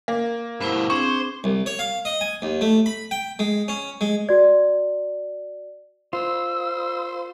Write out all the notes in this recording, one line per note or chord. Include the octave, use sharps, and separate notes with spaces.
A#3
G2 B2 E4 C5 B5
C4 D4 G#4 C5 C#6
C2
C#5
F5
D#5
G#5
D#2
A3
B5
G5
G#3
C#4
G#3
F#4 D5
F4 C5 E6